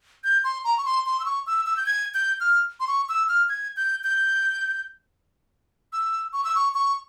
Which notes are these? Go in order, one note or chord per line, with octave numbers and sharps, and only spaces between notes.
G6
C6
A#5
C#6
C6
C6
E6
C#6
E6
E6
G6
G#6
G6
F6
C6
C#6
E6
F6
G#6
G6
G6
E6
C#6
E6
C#6
C#6